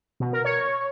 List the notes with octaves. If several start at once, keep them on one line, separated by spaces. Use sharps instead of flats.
B2
A#4
C#5